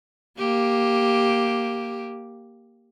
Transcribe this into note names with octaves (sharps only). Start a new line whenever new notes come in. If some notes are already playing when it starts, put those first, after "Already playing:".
A#3 G4